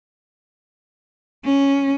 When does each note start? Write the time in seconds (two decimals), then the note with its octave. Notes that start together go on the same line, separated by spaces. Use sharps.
1.45 C#4